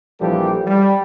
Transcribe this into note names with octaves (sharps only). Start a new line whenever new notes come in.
A#1 E3 F3 G3 G4 A4
G3